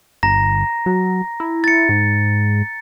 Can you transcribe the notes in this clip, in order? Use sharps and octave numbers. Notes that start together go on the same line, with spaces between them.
G1 A#5 A#6
F#3
E4
A6 C#7
G#2